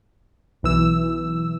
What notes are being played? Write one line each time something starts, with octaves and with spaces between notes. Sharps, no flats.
B1 E3 E6